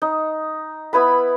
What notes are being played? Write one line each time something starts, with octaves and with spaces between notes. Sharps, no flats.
D#4
B3 E4 B4 B5